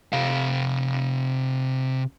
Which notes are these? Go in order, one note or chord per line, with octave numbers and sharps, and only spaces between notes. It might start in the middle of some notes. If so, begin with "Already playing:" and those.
C3 F5